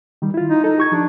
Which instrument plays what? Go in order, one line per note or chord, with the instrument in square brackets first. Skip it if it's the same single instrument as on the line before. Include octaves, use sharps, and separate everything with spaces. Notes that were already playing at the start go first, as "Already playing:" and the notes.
[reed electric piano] D#3 G3
E4 F4
[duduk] D#4
[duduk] D#4 [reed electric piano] A4
[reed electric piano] G4 C#6 G#6
[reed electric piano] F3 [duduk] D4